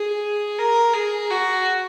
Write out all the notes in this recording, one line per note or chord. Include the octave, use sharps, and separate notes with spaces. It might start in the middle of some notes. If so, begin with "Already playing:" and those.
Already playing: G#4
A#4
G#4
F#4